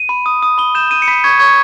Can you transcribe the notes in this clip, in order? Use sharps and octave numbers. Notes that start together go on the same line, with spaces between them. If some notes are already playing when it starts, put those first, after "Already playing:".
Already playing: D#7
B5
D#6
D#6
B5 G7
G6 E7
D#6 D#7
C#7
B5 B6
C#6 G#6
C#6 G#6